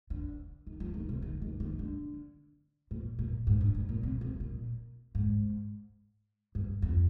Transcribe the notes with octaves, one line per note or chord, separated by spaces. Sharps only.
D3
D#3
F3
D#3
C3
D#3
D#3
D#3
D3
A#2
A#2
G#2
G2
G#2
A#2
C3
C3
A#2
G#2
G2
F2